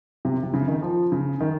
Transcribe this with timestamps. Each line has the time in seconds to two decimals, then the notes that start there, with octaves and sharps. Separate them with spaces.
0.25 C3
0.43 C3
0.54 C#3
0.68 D#3
0.82 F3
1.12 C#3
1.40 D#3